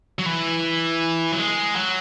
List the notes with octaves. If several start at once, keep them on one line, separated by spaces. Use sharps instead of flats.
F#3
E3
F#3
G#3
F#3